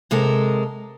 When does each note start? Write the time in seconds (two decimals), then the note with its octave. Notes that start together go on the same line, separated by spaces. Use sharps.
0.11 C3 G#3 A4 A#4